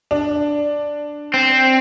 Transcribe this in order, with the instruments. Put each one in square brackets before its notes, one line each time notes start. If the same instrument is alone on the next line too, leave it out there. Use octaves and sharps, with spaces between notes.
[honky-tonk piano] D4
[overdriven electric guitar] C4